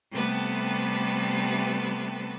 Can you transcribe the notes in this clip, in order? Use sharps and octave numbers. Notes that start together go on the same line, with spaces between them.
C3 G3 A3 B3 A4 B4